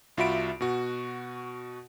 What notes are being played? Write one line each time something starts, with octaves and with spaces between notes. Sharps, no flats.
C2 F4 F#4 E5 B5 D7
B2 F#4